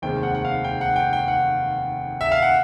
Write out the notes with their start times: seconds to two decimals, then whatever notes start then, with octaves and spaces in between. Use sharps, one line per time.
0.02 F1 D#2 D#3 G#3 C4 G5
0.23 F#5
0.35 F#5
0.45 F5
0.64 G5
0.81 F#5
0.96 G5
1.13 G5
1.28 F#5
2.21 E5
2.32 F5
2.42 F#5